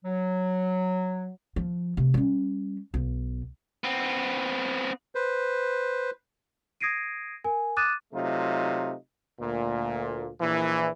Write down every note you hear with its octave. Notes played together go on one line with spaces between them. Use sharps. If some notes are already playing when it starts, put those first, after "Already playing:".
F#3
F3
C3 A3
G3 C#4
B1
B3 C4
B4 C5
D#6 G#6 A#6 C7 D7 D#7
A#4 G#5
D6 D#6 F#6 A6 D#7 E7
C3 F#3 A3 D#4 F4
D2 A#2
A#1 A#2 E3